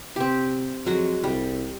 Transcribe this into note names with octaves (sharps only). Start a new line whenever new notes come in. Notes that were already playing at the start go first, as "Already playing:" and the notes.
C3 C4 G4
F2 F#3 G#3 F#4
C2 G3